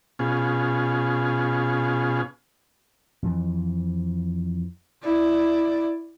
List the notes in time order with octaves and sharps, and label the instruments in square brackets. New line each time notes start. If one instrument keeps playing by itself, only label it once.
[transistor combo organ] B2 C#4 F4 G#4
[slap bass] F2 E3
[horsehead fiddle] E4 D5